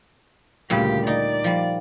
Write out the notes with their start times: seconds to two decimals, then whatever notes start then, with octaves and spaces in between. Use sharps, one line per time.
0.70 D2 A#2 C#3 G3 G4
1.07 D#4 D5
1.44 F3 G3